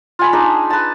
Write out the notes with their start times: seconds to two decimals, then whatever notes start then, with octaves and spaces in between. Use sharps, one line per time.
0.19 F4 G#5 B5
0.33 D4 D#4 G#4 D#5
0.70 B4 A5